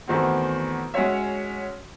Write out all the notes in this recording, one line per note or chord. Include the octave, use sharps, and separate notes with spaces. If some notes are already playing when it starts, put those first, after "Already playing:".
E2 D#3 A3 C4 F#4
G#3 C#4 F#4 C#5 E5